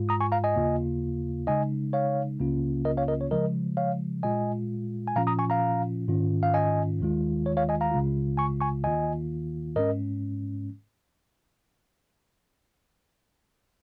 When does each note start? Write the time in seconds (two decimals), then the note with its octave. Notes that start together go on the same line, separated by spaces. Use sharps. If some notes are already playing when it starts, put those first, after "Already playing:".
Already playing: G#2 G#3 F4
0.09 A#5 D#6
0.21 G#5 C#6
0.32 F5 A#5
0.44 D#5 G#5
0.56 D#2 C#3 A#3 F4
1.47 C#3 G#3 D#4 D#5 G#5
1.93 C#5 F5
2.40 C#2 C#3 A#3 C#4 F4
2.85 A#4 D#5
2.97 C#5 F5
3.08 A#4 D#5
3.21 C#5
3.31 C#3 F3 G#3 A#4 D#5
3.77 C#5 F5
4.23 A#2 G#3 F4 D#5 G#5
5.08 G#5
5.15 A#2 F3 C#4 F4 F5 A#5
5.27 A#5 D#6
5.39 G#5 C#6
5.50 F5 A#5
6.08 G#2 D#3 C#4 F4
6.43 F5
6.54 D#5 G#5
7.00 D#2 D#3 G#3 F4
7.46 C#5
7.57 C#5 F5
7.69 D#5 G#5
7.81 F5 A#5
7.92 C#2 C#3 G#3 F4
8.38 G#5 C#6
8.61 G#5 C#6
8.84 D#2 D#3 A#3 F4 D#5 G#5
9.76 G#2 G#3 C#4 A#4 D#5